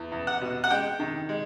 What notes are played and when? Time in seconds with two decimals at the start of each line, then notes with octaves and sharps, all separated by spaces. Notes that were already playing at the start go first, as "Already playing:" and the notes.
Already playing: E2
0.12 E2
0.27 F#5
0.41 B2
0.64 F#5
0.71 G#3 G5
1.00 D#3
1.29 G#3